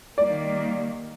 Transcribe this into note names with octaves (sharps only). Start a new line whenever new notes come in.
D#3 G3 A#3 D5